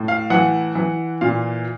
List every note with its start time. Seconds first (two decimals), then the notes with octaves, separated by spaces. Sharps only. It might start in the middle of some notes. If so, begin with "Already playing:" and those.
Already playing: A2
0.08 F5
0.30 E3 F#5
0.75 E3
1.21 A#2 F5